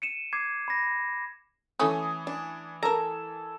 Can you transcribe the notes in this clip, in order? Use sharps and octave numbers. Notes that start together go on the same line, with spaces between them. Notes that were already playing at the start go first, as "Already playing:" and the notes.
C#7 D#7 E7
D6 G#6 C7
B5 A#6
E3 A3 C#4 D#6
D4
A4 A#4 A#5